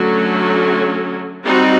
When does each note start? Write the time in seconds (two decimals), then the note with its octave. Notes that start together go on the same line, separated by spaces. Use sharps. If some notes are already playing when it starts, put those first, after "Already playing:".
Already playing: D3 F#3 A3 C#4
1.45 G3 C4 D#4 F#4